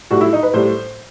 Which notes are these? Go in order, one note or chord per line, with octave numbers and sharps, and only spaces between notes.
A2 G3 F#4
E4
D#4
B4
A2 G3 C5